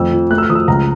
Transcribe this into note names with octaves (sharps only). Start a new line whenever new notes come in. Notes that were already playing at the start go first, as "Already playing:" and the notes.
Already playing: F2 A3 E6
F3
A3 F#6
E6
F6
F3 D#6
E6
C#2 A#5